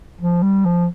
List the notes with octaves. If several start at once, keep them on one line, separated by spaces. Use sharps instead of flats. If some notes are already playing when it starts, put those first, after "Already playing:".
F3
G3
F3